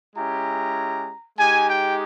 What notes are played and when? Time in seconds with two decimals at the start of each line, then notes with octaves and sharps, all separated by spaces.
0.16 G#3 C#4 E4 G4 A#5
1.38 G#3 D#4 G4 G#5
1.69 G5